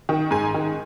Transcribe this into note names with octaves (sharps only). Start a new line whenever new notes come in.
D#3
G#2 G#5
D#3